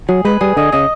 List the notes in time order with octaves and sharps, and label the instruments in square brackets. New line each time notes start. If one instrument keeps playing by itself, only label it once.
[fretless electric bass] F#3 [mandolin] G#4
[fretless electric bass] G#3 [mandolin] B4
[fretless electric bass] G3 [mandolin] G#4
[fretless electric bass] D3 [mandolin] D#5
[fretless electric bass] C#3 [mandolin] D#5